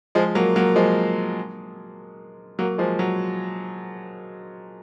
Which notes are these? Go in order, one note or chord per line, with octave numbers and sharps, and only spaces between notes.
F3 G#3
F#3 A#3
F#3 A#3
F3 G#3
F#3 A#3
F3 G#3
F#3